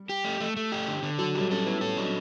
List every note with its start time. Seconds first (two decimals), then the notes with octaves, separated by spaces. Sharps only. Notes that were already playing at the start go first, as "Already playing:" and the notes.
Already playing: G3
0.09 G4
0.24 A3
0.40 A3
0.56 A3
0.72 G4
0.88 D3
1.03 D3
1.19 F#3 A4
1.35 F#3 G3
1.50 C#4 A4
1.66 B3 E4
1.81 C#4 A4
1.97 F#3 D4